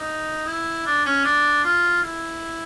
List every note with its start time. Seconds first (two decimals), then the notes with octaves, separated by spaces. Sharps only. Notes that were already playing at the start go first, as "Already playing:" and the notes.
Already playing: D#4
0.47 E4
0.86 D4
1.06 C#4
1.25 D4
1.64 F4
2.03 E4